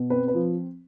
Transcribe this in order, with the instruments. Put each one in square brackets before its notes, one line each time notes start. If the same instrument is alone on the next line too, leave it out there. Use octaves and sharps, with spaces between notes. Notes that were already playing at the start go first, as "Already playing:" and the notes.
Already playing: [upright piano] B2
C4 B4
B4
F3